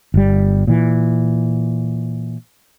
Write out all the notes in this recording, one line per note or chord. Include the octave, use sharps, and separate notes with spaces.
G1 G3
A#2 E3